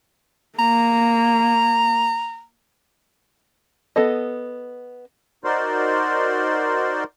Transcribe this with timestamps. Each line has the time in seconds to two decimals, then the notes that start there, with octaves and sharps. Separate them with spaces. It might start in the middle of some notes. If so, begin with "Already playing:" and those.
0.59 A#3 A#5
3.96 B3 A4 D#5
5.44 D#4 F#4 A#4 C5 D5 C6